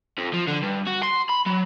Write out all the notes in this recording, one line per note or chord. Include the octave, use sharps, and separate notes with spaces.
F2
F3
D3
G2
F#4
C6
B5
F#3